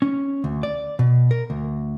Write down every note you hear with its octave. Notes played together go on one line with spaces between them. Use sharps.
C#4
D2
D5
B2
A#4
D2